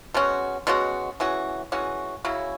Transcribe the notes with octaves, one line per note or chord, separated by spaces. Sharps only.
B2 G#3 C#4 F#4
B2 G#3 C#4 F#4
E3 G#3 C#4 F#4
E3 G#3 C#4 F#4
C#3 F#3 C#4 E4